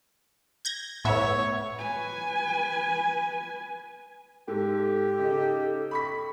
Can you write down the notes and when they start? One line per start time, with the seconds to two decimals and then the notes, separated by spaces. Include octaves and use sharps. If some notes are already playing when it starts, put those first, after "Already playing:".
0.65 G6 G#6 A#6
1.05 A2 B3 C#5 E5
1.78 B4 G#5
4.48 G#2 G4 A4
5.19 C#3 D#4
5.91 B5 C#6 B6